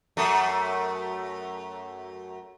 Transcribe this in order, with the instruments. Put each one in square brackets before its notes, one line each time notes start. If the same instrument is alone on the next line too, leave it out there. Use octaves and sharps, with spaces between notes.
[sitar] F#2 A3